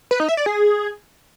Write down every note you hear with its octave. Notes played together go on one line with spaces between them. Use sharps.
B4
D#4
E5
D5
G#4